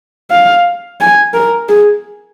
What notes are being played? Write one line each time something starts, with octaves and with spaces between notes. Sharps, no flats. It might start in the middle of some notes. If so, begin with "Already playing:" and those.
F5
G#5
A#4
G#4